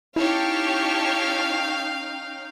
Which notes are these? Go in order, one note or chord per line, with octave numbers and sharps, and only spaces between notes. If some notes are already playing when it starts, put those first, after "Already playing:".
C#4 D#4 E4 G4 C#5 F5 G5 A5